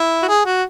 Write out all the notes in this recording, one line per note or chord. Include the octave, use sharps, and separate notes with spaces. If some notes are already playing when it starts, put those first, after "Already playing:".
Already playing: E4
F#4
G#4
F#4